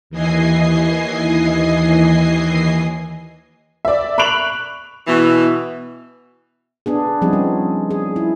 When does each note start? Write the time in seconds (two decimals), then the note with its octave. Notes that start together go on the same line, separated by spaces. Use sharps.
0.10 D#2 E3 D#5 G#5 C7
3.85 D5 E5
4.18 B5 C#6 F#6 D7 F7 F#7
5.06 B2 E3
6.86 B3 D4 G#4
7.22 F3 G3 C4 D#4 G#4
7.33 C#4
7.91 G#4
8.16 E4